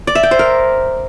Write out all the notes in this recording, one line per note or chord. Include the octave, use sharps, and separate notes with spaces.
D5
E5
G5
C5
A#4